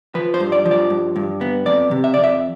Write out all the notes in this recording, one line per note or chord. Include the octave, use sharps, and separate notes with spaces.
F3 B4
C5
G2
D5
F3
D5
G2
G2
B3
F2 D5
C3
E5
F2 D5
E5